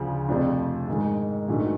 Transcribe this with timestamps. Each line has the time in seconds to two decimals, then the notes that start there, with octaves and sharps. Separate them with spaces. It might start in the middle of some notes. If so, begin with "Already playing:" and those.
Already playing: D2 C#3 F3
0.28 F2 C3 F3 A3 D4
0.88 G#2 D#3 G#3
1.48 A#1 G#2 D#3 F#3 A3